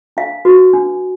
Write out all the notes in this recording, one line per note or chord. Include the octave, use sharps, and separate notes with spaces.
D4 F5
F#4 B4
D4